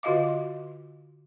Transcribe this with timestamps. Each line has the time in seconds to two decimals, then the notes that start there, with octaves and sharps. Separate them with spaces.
0.03 D3 F4 F#4 D#5 F5 D6